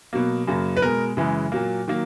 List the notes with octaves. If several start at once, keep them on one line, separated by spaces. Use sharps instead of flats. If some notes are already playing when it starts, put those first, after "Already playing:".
B2 F#3 A#3
F#2 C#3 F#3 A#3
B4
B2 G#3 A#4
F#2 C#3 E3 G#3
A#2 F#3 A#3
D#3 F#3 A#3